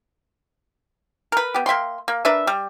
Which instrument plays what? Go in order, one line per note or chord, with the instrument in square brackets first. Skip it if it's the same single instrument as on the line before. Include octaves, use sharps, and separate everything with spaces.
[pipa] A#4 B4
B3 G4
A#3 E5 G5 C6
A#3
D4 A#4 B4 E5
G3